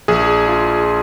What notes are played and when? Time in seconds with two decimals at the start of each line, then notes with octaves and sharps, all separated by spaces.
0.08 A#1 G#4
0.48 F4